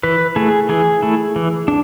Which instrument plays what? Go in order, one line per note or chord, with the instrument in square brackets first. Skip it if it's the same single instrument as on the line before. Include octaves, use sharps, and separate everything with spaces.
[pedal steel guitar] E3 B4
A3 E4 G#4
E3 G#4
A3 E4
E3
D4